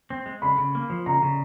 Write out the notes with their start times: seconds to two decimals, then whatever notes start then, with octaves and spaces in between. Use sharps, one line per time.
0.10 C4
0.26 G#3
0.42 C#3 B5
0.58 C#3
0.75 A#3
0.90 F3
1.06 C#3 A#5
1.22 C#3